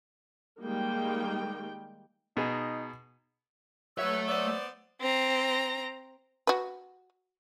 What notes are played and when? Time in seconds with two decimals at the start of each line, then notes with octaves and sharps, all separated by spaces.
0.60 D#3 G3 G#3 A#3 G5
2.37 B2 D#4 G#4
3.98 F#3 A3 B4 C#5 E5 E6
4.28 B3 C5 D5
5.01 C4 A#5
6.47 F#4 B4